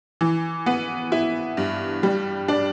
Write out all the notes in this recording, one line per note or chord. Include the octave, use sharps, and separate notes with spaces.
E3
B3
E4
G2
G3
D4